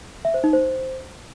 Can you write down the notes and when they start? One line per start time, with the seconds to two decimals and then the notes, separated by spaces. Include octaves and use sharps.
0.25 E5
0.34 C5
0.44 D#4
0.53 C5